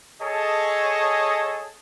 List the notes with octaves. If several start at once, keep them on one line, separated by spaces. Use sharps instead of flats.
G#4 A4 C#5 D#5 A5